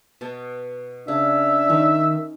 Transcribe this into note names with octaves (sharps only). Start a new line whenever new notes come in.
B2 A5
C#3 D4 E5
D#3 C#4 D#4